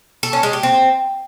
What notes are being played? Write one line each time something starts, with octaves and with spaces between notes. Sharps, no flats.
A4
C#4
G#3
G4
C4